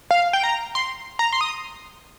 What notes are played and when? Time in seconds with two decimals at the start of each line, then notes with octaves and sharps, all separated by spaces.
0.11 F5
0.33 G5
0.43 A#5
0.75 C6
1.19 A#5
1.33 C6
1.41 D#6